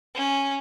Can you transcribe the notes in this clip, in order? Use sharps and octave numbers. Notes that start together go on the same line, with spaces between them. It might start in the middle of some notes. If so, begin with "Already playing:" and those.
C#4